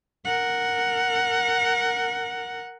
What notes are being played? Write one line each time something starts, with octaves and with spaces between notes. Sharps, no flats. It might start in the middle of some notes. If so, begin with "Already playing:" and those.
A#4 F#5